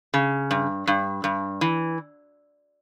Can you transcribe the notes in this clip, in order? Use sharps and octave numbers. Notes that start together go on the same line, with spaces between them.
C#3
G2
G2
G2
E3